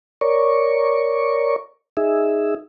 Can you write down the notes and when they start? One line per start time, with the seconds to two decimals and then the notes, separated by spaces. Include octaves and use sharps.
0.21 A#4 C#5 D5 C#6
1.97 D#4 G#4 E5